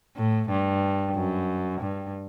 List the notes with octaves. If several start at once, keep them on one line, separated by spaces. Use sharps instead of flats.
A2
G2
F#2
G2